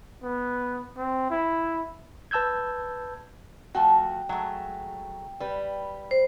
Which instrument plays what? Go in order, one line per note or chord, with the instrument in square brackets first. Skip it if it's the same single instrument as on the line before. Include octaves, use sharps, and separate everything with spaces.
[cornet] B3
C4
E4
[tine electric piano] B4 A5 E6 G6 G#6
[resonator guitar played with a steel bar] F3 A3 F#4 [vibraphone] G5
[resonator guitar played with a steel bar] F#3 G#3 A3
G3 B4
[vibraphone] C5